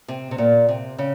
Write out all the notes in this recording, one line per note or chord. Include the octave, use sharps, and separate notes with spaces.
C3
C3
A#2
C3
C#3